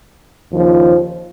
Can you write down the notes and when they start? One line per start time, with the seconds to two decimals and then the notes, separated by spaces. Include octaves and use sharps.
0.52 D#2 C#3 F3